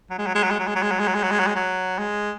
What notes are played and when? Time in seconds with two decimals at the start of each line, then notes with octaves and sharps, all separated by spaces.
0.10 F#3
0.18 G#3
0.26 F#3
0.35 G#3
0.43 F#3
0.51 G#3
0.59 F#3
0.67 G#3
0.75 F#3
0.82 G#3
0.91 F#3
0.99 G#3
1.08 F#3
1.14 G#3
1.23 F#3
1.31 G#3
1.39 F#3
1.46 G#3
1.55 F#3
1.98 G#3